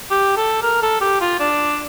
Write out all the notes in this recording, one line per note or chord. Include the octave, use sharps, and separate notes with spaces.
G4
A4
A#4
A4
G4
F4
D4